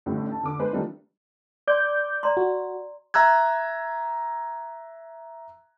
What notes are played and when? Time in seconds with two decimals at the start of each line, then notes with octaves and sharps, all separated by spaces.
0.06 A1 A2 D3 G3
0.31 A5
0.43 D3 D6
0.59 G#3 B3 B4 C5
0.73 D#3 F3 G3 A3 D4 D#4
1.68 D5 C6 D6 G6
2.23 D5 A#5 C6
2.37 F#4
3.14 E5 A#5 E6 F#6 G#6